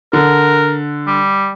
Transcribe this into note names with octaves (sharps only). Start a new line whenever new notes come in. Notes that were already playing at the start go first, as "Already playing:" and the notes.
D3 A#4
G3